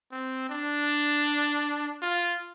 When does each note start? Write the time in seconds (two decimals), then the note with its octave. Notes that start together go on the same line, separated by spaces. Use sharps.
0.12 C4
0.50 D4
2.02 F4